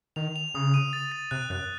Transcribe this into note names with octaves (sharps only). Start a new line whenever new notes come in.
D#3 F7
F7
C#3 D#6
D#7
A6
A6
C3 F#6
F#2 F#6